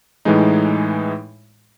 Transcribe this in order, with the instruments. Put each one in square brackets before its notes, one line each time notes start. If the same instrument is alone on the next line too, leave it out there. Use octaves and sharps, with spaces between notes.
[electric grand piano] A2 E3 G#3 D#4